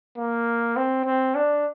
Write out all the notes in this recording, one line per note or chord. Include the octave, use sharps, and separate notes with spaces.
A#3
C4
C4
D4